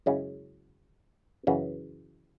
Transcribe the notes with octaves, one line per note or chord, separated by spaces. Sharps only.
F#2 C#3 G#3 C#4 E4
F#2 C#3 E3